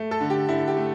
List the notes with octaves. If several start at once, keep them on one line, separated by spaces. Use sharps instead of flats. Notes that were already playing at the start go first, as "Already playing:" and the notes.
Already playing: A3
A4
D3
G4
D3 E4
G4
A3